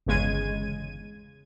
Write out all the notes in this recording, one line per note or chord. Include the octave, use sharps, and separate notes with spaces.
G1 E2 C#3 G#3 G#6 D#7